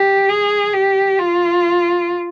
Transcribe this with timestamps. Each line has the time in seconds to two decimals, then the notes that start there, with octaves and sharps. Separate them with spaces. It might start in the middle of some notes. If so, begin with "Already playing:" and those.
Already playing: G4
0.29 G#4
0.74 G4
1.19 F4